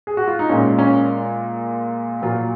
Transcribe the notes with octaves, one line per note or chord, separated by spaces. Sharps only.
G#4
F#4
F4
D#4
A#2 G#3 C#4
C#4
A#2 F#3 F4